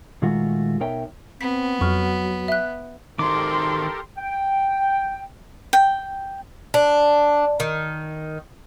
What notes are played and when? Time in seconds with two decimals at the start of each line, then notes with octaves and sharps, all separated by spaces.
0.22 A#2 D#3 G#3 A3 F4 F#4
0.80 B2 D#4 A#4 C#5 E5 G5
1.41 B3 C4 B6
1.81 F2 F#3 C#6 F6
2.48 E5 F#6
3.19 D#3 G4 A4 A#4 C5 C6 D6
4.18 G5
5.73 G5
6.74 D4
7.60 D#3